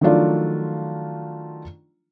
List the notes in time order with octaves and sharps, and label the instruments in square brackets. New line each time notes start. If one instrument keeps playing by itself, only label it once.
[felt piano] D#3 F3 F#3 A3 D4 F4